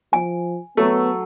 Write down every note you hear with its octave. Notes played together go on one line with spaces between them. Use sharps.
F3 G#5
F#3 A3 B3 A4